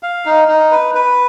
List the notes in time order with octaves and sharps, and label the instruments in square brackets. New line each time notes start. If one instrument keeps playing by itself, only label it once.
[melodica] F5
D#4
D#4
B4
B4